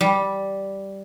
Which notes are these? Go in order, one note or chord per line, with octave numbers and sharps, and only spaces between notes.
G3